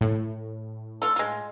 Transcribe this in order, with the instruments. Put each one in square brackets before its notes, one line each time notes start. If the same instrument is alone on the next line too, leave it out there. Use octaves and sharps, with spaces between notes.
[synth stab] A2
[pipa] F4 A4
G#3 F4